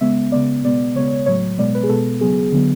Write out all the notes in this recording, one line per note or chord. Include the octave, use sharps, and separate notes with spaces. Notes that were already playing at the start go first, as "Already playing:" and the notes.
C#3 G#3 B3 E5
C#3 G#3 B3 D5
B2 G#3 B3 D5
C#3 G#3 B3 C#5
A2 F#3 A3 C#5
B2 G#3 B3 D5
B4
G#4
B2 G#3 B3 A4
C#3 F#3 B3 G#4
D3 F#3 B3